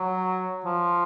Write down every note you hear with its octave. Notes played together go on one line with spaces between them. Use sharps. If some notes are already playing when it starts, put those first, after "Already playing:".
Already playing: F#3
F3